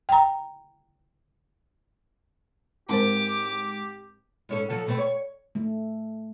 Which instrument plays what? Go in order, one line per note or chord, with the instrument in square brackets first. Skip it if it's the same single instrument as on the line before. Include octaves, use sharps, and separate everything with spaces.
[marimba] G5 A#5
[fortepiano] G#2 [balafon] C4 A#4 C5 [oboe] G4 [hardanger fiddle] D6
[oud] G#2 C#4 A4
F3 F#3 A4
B2 A3 C4
C#5
[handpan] A3